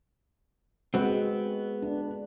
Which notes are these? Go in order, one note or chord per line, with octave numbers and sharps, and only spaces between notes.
G#3 B3 C4 F#4
D4